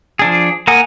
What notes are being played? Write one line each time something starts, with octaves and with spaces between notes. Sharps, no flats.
F3 D4 G#4
A#3 A#4 F#5 G#5 D#6